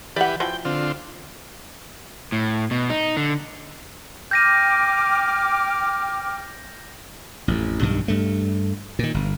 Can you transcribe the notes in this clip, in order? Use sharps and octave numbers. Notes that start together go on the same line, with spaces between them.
E3 G4 B4 D5 F#5
E3 F3 F#4 G5
D3 C4 F4
A2
B2
D#4
D3
G5 D6 F6 G6 A#6 D#7
A1 F2
B1 G2 D#3
G2 A3
A#2 D#3
G1